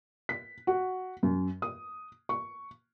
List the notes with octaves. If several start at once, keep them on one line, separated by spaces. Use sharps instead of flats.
B6
F#4
F#2
D#6
C#6